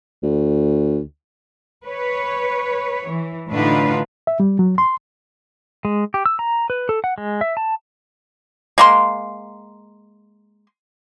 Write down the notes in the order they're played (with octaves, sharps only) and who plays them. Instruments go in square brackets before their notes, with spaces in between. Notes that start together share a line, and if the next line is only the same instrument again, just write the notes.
[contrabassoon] D2
[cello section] B4 C#5
E3
A2 D3 D4 D#4 F4 B4
[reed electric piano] E5
G3
F#3
C6
[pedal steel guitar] G#3
G4
E6
A#5
B4
A4
F#5
G#3
E5
A5
[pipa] G#3 A#3 C6